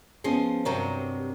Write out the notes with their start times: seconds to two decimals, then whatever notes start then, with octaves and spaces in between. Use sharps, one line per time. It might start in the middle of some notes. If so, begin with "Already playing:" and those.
0.24 F3 B3 C#4 G#4 D#5 C6
0.65 G2 C3 F#3 A#4 C#5 A#5